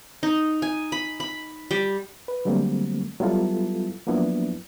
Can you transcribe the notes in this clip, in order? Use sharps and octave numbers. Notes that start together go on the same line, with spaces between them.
D#4
G#5
B5
B5
G3
B4
D3 F#3 G3 A3 A#3 C4
F#3 G3 B3 E4 F4 A4
F3 F#3 A#3 B3 D4 E4